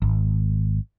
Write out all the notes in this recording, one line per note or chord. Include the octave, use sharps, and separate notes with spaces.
G#1